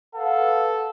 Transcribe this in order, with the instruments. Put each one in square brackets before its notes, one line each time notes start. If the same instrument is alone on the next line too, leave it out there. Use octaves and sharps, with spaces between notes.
[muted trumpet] A4 [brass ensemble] B4 F5 F#5